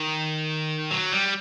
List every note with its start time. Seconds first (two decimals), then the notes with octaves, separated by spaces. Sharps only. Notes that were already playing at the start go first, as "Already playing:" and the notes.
Already playing: D#3
0.91 F#3
1.12 G3